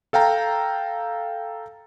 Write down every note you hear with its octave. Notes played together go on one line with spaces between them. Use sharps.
A4 F5 G5 A#5